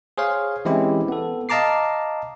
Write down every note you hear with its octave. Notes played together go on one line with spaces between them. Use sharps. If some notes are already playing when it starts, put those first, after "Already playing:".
G#4 C5 C#5 F5
E3 G#3 C4 C#4 E4 G4
B3 A4
D#5 F5 A5 A#5 D6 C7